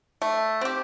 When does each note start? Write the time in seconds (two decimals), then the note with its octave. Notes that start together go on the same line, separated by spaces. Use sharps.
0.22 A3
0.61 C4 G4